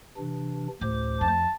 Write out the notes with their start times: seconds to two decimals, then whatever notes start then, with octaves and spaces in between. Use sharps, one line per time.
0.17 C3 E3 D4
0.81 A1 D2 C5 D6
1.21 F2 A5